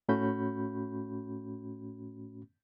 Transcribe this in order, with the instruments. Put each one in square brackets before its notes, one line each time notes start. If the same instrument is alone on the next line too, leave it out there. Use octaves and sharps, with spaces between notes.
[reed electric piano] A2 A3 C#4 F#4 B5 G6